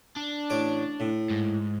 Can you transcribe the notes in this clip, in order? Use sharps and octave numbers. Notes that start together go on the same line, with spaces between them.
D4
A1 C#5 D6
A2
G#2